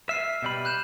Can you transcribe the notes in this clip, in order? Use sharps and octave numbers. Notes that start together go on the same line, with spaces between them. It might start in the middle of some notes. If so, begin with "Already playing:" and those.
E5 F6 C7 D#7
B2 G3 B5
F#6 G6 E7